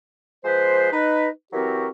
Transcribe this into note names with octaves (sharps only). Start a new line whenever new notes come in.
F3 G#3 B4 C5
D#4 B4
E3 F#3 C4 F#4 G4 A#4